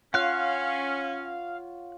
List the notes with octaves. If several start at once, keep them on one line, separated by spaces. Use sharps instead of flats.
C#4 F4 C#5 F5 F#5 F#6